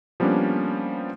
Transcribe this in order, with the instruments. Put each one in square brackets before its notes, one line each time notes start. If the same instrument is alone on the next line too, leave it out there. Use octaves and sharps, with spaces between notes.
[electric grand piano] F3 G3 A#3 B3 C#4 D4